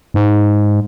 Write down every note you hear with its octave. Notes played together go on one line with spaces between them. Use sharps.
G#2